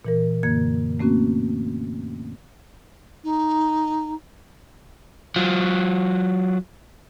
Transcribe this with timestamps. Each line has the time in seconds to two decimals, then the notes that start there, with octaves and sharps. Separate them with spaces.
0.05 A#2 E3 A#4
0.43 F#2 D3 A#3 G#6
1.00 A3 A#3 C4 C#4 F#4
3.23 D#4
5.36 F#3 F4